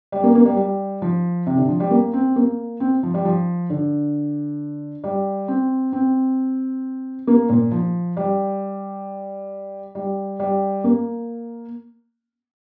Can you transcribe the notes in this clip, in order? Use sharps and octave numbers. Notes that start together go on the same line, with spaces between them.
G3
A#3
A#3
G3
G3
F3
C3
D3
F3
G3
A#3
C4
A#3
C4
F3
G3
F3
D3
G3
C4
C4
A#3
A#2
F3
G3
G3
G3
A#3